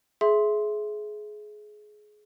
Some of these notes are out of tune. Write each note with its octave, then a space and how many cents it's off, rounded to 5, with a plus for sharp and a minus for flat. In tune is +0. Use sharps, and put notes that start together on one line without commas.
G#4 +20 E5 +0 C6 +0